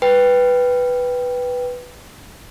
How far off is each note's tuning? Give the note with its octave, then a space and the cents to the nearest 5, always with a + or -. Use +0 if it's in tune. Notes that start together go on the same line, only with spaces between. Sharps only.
B4 +0 G5 +0